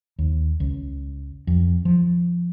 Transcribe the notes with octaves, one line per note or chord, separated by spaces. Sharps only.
D#2
C#2
F2
F3